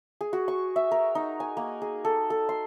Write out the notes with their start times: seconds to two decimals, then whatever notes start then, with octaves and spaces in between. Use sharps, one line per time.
0.21 G#4
0.33 F#4
0.48 C#6
0.76 E5
0.91 A#4
1.15 D#4
1.40 G#5
1.57 A#3
1.82 G#4
2.05 A4
2.30 A4
2.49 C6